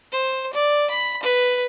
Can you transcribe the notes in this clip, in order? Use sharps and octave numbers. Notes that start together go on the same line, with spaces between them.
C5
D5
B5
B4